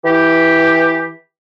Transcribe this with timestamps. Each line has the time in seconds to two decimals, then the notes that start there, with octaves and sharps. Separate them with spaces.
0.05 E3 G4